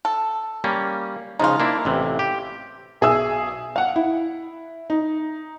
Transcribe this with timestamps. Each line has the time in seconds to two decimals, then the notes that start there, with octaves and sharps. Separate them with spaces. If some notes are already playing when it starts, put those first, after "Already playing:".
0.05 A4
0.64 G3 A#3 C#4
1.39 C#3 F3 G#3 D#4 F4
1.60 A#3 D4 E4
1.85 A1 C3 E3
2.19 G4
3.01 B1 G#4 E5 E6
3.76 F5 F#5
3.96 E4
4.90 D#4